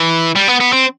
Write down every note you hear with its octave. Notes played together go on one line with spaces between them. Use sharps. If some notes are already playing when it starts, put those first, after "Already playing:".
Already playing: E3
G3
B3
B3
C4